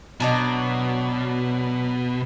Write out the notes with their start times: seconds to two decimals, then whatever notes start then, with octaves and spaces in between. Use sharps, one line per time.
0.20 B2 F#3 D4 D#4